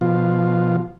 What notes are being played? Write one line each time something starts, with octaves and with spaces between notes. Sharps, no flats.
B2 F3 F4